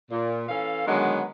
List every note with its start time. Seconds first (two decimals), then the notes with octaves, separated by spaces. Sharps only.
0.11 A#2
0.49 E3 C#4 A4 F5
0.87 D3 D#3 F#3 G#3 A#3 B3